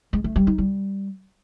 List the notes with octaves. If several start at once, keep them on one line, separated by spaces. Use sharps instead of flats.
G#3
A3
G3
D#4
G3